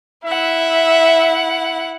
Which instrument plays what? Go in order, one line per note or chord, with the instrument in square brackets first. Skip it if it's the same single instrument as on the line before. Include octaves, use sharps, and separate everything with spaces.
[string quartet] E4 F#5 [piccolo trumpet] E5